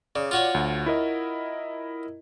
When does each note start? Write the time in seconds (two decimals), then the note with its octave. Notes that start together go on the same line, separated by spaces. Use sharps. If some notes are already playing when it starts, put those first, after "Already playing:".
0.16 C#3 D5
0.31 F4 F#4 C#5
0.54 D2
0.86 E4 A#4 D#5